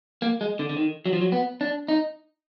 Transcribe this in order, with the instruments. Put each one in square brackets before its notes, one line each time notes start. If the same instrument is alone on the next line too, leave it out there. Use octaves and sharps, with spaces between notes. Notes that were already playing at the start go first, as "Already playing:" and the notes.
[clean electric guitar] A#3
G#3
D3
D3
D#3
F#3
F3
F#3
B3
D4
D#4